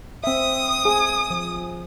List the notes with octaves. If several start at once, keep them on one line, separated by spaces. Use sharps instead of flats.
C4 E5 D#6
G#4
F3